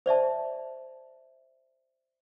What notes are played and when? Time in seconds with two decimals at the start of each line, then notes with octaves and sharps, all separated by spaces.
0.06 C5 D5 E5 A5